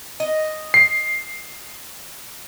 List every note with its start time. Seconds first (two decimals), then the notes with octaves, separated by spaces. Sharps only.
0.20 D#5
0.74 C7